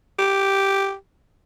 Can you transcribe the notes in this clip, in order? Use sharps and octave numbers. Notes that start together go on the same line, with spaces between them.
G4